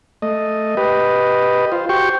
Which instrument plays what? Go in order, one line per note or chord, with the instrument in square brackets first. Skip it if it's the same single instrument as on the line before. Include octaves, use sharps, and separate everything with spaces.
[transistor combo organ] A3 D#5
G4 B4 D#5
F4 C5
F#4 G4 C5 G5 C#6